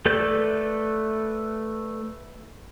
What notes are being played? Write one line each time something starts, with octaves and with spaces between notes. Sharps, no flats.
A3 A4 B4 D5 G6